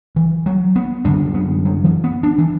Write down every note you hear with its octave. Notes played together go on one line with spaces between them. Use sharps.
E3
F#3
B3
F#2 D3 D4
B3
F#3
E3
B3
D4
E3